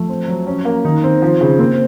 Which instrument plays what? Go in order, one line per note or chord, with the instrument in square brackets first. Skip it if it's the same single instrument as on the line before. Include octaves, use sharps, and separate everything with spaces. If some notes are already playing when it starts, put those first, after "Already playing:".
Already playing: [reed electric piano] F3 [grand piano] A3
[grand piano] C4
F#3
C#4
A#3
[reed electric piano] D#3 [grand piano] D#4
[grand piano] C4
F3
C#3
[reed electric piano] A#3 [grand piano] C4